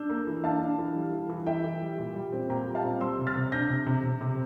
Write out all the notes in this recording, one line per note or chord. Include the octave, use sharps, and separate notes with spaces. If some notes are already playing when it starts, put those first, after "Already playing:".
Already playing: D4 E6 G6
A#3
E3
D4 F5 A5
D4
E3
G3
E3
E3
E3 E5 G5
E3
G3
A#2
G3
C4
A#2 G5 A#5
G3
F5 A5
C4
G3 C6 E6
C3
F6 A6
C3
D4 G6 A#6
C3
C3
C3
C3